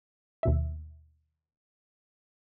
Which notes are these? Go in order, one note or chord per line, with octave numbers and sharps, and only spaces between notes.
D#2 B2 E5